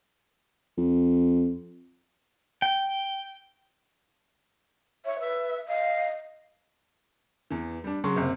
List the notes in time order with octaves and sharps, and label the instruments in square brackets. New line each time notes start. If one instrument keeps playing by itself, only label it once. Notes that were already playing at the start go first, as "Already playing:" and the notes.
[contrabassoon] F2
[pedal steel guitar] G5
[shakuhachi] C#5 [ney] E5
[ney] B4 [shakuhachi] E5
[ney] D#5 [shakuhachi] F5
[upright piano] E2 E3
G3 D4
C#3 F#3 C6 C#6
F#1 C3